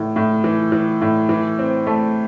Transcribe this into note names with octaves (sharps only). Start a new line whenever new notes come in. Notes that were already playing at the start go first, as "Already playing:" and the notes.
Already playing: A2 E3
A2
E3
E3
A2
E3
C4
A3